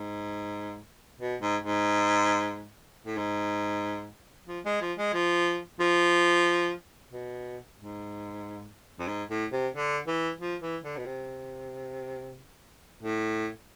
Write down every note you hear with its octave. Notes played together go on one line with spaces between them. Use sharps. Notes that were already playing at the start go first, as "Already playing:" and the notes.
Already playing: G#2
B2
G#2
G#2
A2
G#2
F3
G#3
F3
G#3
F3
F3
B2
G#2
F2
G#2
A2
C3
D3
E3
F3
E3
D3
B2
C3
A2